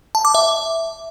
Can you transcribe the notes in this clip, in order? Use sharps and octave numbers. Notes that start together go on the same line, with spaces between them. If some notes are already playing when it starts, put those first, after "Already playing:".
A5
D6
E5